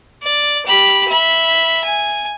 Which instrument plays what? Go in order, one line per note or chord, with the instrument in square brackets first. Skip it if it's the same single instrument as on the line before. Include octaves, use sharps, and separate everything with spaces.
[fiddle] D5
G4 B5
E5 B5
G#5